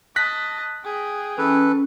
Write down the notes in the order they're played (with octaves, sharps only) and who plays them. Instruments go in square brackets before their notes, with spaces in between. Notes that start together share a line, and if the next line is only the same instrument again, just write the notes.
[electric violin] D#5 A5 [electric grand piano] F#6 A#6 B6
[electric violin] G#4 G5
[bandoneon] E3 A4 B4 [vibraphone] C#4